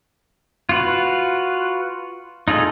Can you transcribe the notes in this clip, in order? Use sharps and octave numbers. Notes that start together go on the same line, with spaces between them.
F4 F#4 B4
D#4 F4 G#4 A4